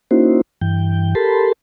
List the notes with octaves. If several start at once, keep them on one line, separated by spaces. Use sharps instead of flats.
A#3 C#4 D#4 E4 F#4 C5
G2 E3 G5
G4 A4 A#4 A5 B5 C6